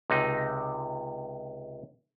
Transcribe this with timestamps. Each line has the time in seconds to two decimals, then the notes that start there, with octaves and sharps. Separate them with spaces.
0.10 C#2 C3 D#4